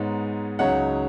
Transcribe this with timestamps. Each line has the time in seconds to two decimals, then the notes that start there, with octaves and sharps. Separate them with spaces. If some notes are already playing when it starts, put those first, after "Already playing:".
Already playing: G#2 G#3 B3 D#4 C#5
0.59 C#2 C#3 F#3 D#4 C#5 F#5